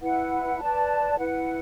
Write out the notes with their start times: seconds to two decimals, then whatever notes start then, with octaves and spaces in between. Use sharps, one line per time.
0.02 E4 B4 F#5
0.60 B4 D5 A5
1.19 E4 B4 F#5